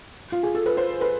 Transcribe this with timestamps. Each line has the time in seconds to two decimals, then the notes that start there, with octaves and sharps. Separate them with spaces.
0.32 F4
0.43 G#4
0.55 A4
0.66 B4
0.77 C5
1.01 B4